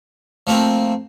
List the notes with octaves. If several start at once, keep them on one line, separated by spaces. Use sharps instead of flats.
F3 A3 A#3 C4